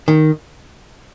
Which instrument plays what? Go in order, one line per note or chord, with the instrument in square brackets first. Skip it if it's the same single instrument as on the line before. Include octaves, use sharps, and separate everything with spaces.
[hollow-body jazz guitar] D#3